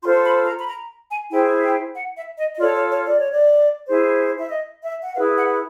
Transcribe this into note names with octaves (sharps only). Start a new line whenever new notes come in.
F4 A4 C5 C6
B5
A#5
B5
A#5
G#5
E4 G#4 C5 G5
G5
F#5
E5
D#5
D#5
F4 A4 C#5 D5
C#5
C#5
D5
C#5
D5
E4 G#4 C5
E5
D#5
E5
F#5
E4 G#4 B4 F5
F#5